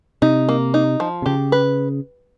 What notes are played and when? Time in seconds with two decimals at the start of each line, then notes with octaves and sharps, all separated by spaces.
0.22 C3 D#4
0.49 A#3
0.74 D#4
1.00 F3
1.22 C3
1.26 C#3 G4
1.52 B4